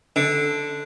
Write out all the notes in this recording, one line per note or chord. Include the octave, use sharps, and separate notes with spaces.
D3